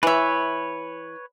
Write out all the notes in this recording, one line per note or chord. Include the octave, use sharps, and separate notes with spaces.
E3 B4 C#5 E5